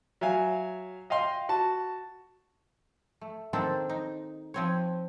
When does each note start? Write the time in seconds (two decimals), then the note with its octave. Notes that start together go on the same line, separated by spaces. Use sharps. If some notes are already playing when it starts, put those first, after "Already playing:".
0.21 F#3 E5 F5 G#5
1.10 D#5 F5 G5 C6
1.49 F#4 A5
3.21 A3
3.53 D#3 A#3 C4 D4 A4 A5
3.89 D#4
4.54 F3 C4 C#5